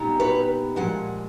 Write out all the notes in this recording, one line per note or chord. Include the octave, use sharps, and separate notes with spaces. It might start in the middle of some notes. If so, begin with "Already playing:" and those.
Already playing: A#2 G3 B3 D#4
B4 C#5
A#2 F3 G#3 F#5